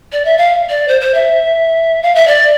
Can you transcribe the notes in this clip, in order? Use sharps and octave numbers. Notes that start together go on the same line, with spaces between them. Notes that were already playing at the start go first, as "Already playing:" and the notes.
D5
E5
F5
D5
C5
C5
E5
F5
E5
D5